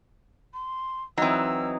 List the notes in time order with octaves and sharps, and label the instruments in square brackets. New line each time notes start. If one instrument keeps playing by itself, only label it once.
[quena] C6
[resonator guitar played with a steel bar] E3 F#3 [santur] C4 D#4 [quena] E6